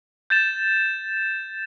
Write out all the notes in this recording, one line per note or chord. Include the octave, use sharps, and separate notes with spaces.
G6 A6 E7